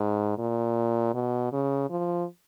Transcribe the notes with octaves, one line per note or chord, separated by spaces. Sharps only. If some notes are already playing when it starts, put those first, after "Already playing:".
Already playing: G#2
A#2
B2
C#3
F3